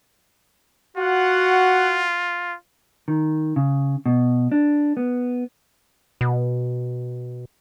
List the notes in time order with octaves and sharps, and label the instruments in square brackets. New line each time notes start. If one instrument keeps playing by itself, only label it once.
[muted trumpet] F4 [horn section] F#4 F#5
[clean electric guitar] D#3
C#3
B2
D4
B3
[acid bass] B2